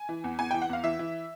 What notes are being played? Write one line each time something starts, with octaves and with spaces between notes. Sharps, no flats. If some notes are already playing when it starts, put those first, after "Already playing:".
Already playing: G#5
E3
E2
E2 G#5
E3 G5
F#5
E2 F5
E3 E5
E3